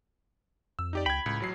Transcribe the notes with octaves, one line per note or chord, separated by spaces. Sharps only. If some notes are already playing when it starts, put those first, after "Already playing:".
F2 E6
D#4 G4 D5
C#2 G5 B5 G#6
C#2 A2
A1 F#3 C7